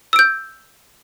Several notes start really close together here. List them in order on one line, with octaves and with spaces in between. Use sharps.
E6 D7 G6